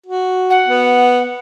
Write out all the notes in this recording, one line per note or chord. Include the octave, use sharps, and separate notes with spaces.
F#4
F#5
B3